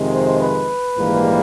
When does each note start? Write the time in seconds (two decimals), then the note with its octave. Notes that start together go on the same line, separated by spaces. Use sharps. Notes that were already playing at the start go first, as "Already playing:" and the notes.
Already playing: F2 C3 D#3 G#3
0.13 C5
0.41 B4
0.97 A#1 G#2 E3 G3 A#3